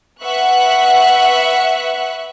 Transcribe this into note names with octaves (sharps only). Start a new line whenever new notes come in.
B4 E5 F#5 C#6 F#6